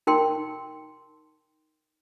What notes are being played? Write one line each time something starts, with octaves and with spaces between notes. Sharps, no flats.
D#4 A#4 G5 C6